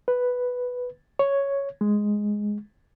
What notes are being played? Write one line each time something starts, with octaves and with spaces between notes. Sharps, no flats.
B4
C#5
G#3